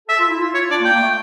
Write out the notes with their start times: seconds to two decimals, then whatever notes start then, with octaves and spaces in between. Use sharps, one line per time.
0.08 A4 E5
0.18 F4
0.29 E4
0.39 F4
0.55 C#5
0.70 D4 D5
0.80 A#3
0.85 G5
0.93 A#3
1.01 A3